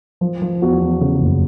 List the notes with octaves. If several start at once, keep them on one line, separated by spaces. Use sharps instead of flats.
F3
F3
E2 F#4
E2
C#3
F#1